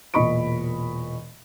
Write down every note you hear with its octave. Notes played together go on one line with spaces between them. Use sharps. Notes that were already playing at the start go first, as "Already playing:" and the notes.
E1 A#2 D#5 B5 C#6 D7